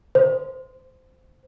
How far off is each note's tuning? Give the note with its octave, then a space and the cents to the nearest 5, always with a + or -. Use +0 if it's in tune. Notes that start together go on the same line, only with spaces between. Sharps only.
C5 -15